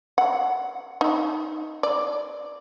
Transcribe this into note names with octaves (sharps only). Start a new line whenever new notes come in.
F#5
D#4
D5